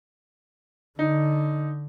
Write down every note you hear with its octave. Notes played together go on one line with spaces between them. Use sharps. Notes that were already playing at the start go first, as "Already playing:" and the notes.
D3 D#4